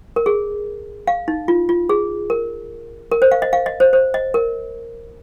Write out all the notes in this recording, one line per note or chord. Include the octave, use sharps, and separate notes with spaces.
A#4
G#4
F5
D#4
F4
F4
G#4
A#4
A#4
C5
F5
D#5
F5
D#5
C5
C5
D#5
A#4